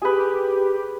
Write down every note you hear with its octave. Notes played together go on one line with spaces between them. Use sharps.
G4 G#4 B4